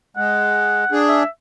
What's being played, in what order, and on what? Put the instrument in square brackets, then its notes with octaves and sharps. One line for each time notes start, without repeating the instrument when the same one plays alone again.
[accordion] G#3 [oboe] F#5
[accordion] D4 G#4
[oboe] E5